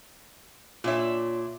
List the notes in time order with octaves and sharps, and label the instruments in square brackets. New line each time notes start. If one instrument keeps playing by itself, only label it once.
[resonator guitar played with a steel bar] A#2 D4 E5 [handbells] F4 C#5